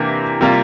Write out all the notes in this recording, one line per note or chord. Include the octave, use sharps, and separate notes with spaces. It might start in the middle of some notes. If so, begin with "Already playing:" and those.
Already playing: C3 E3 A#3 D4
C3 G3 A#3 F4